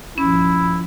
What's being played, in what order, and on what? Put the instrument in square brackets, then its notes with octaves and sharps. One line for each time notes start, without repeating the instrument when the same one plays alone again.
[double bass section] A#1 G2 F3 [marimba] C#4 [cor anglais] E4